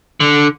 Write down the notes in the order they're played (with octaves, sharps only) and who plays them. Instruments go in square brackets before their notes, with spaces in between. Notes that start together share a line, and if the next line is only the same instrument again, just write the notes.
[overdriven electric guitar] D3